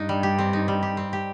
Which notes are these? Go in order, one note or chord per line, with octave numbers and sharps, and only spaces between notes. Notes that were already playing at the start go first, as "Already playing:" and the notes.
Already playing: G2 D4 D#4
G3
G4
C4
D#4
G3
G4
C4
G4